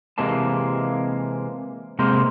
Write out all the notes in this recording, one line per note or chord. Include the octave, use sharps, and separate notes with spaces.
C3 E3 G#3 A#3 A5
C3 G#3 A#3 A#4 C5